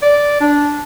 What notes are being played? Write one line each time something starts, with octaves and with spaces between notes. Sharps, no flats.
D5
D4